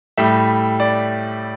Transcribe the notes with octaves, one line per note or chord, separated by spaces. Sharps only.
A2 G3 E5
D5